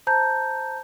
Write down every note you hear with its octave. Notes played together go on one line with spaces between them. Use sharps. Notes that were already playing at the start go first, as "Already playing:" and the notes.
C5 A5 A#5 G6